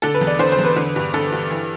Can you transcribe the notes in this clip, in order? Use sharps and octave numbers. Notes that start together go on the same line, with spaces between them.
D3 A4
B4
E2
D5
D3 C5
C5
E2
B4
D3
G2
D3 A4
G2
E3